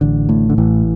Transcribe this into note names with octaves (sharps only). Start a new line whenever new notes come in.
A1 D3
A2
D3
A1 E3